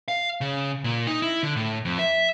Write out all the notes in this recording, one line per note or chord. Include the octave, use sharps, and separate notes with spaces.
F5
C#3
A#2
D#4
E4
D3
A2
F2
E5